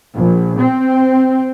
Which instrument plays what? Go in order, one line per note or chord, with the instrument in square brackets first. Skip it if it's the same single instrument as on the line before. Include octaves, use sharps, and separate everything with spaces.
[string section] A#1
C4